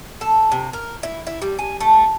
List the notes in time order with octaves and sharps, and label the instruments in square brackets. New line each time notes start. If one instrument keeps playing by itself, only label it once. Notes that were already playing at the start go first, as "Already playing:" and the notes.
[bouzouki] A4
C3
A#4
E4
E4
G3
G#5
A3